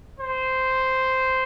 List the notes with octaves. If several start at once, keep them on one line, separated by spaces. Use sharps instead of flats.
C5